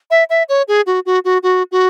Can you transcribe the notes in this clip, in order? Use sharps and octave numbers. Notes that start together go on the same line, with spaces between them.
E5
E5
C#5
G#4
F#4
F#4
F#4
F#4
F#4